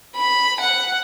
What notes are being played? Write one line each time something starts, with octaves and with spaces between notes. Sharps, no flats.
B5
F#5